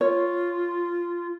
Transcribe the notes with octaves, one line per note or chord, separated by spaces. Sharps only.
F4 C#5